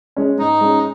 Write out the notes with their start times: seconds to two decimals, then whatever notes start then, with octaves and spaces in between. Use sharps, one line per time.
0.16 G#3 C#4
0.38 G#2 D#4
0.61 G#3 C#4